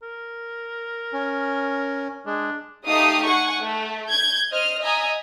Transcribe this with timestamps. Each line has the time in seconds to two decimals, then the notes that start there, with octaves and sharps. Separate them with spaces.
0.02 A#4
1.13 C#4
2.26 G#3 D4
2.86 A3 D#4 G4 F5 D#6 C7
3.24 F#5 G#5 C#6
3.59 A3
4.09 G6 G#6
4.51 C5 D#5 F6
4.81 D#5 E5 G#5 A#5 D#6